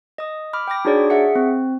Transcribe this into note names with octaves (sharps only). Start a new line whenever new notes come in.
D#5 D#6
B5 D6 F6
G5 B5 D6 A#6
D4 D#4 F#4 G#4 C#5 D5
G#4 E5 F#5 C#7
C4